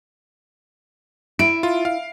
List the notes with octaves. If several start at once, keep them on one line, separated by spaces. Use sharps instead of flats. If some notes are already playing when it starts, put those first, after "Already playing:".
E4 D7
F4
F5